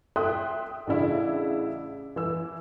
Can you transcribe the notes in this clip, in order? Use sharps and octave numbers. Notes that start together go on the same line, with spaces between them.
E5 G5 C6 D#6 F#6
A1 C#3 D4 E4 F5
E3 E4 E6